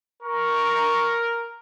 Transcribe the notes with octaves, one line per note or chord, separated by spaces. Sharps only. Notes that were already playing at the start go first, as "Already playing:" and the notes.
A#4 C#6